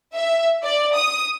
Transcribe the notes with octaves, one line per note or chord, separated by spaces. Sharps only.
E5
D5
D#6